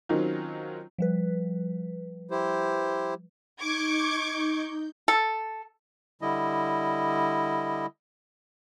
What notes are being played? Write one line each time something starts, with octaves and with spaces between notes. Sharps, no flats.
D#3 F#3 C4 C#4 D#4 F4
F3 G3 B4
E4 G4 C5
D#4 C#6 D6 G6 G#6
A4
D3 G3 E4 D#5